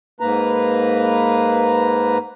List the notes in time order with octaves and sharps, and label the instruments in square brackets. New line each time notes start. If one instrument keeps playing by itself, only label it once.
[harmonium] G#2 A#3 B4 A#5